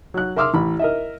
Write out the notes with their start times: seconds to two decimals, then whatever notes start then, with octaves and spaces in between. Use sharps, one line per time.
0.14 F#3 F#6
0.36 A#4 E5 C6 D6 E6 F6
0.54 A1 B5
0.79 A#4 D#5 E5